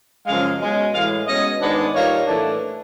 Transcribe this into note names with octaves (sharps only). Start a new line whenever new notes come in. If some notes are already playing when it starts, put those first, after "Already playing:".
F#2 C#3 F3 G#3 F5
B2 G#3 C#4
A2 E3 G#3 F5
B2 G#3 C#4 D#5
G#2 D#3 G#3 B3 D4
A#2 G3 A#3 D#4 C#5
A2 E3 A3 D4